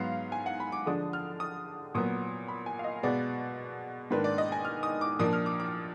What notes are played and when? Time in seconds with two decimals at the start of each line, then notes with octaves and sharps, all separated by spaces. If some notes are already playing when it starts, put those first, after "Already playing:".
Already playing: G#2 F#3 B3 F5
0.32 G#5
0.46 F#5
0.60 B5
0.72 D6
0.86 D3 F3 G#3 D4 D#6
1.13 F6
1.40 D#6
1.95 A#2 F#3 B3 D#6
2.48 B5
2.66 G#5
2.79 F5
2.84 D#5
3.03 B2 G#3 B3 D5
4.11 G#2 D#3 A#3 D4 B4
4.24 D5
4.38 D#5
4.52 G#5
4.65 F6
4.83 D#6
5.01 D6
5.19 A#2 F3 A#3 D4 D#6
5.33 F6
5.46 D6
5.60 D6